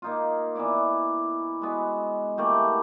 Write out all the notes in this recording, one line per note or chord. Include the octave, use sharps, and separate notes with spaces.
A#3 D#4 F4
E3 B3 E4 D5
G#3 B3 F#4
E3 A3 A#3 G4